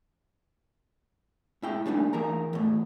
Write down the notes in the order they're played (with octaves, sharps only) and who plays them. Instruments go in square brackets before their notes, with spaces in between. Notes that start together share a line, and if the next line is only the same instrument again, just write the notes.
[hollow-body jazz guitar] G#2 E4 G5
G3 A#3 C4 D4 D#4
E2 E3 A#4 A#5
E2 A2